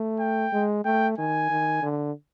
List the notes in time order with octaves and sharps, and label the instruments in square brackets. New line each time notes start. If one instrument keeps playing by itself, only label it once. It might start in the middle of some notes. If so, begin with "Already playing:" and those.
Already playing: [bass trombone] A3
[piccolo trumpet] G5
[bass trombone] G#3
[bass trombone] A3 [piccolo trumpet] G5
[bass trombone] D#3 [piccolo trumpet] G#5
[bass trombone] D#3
D3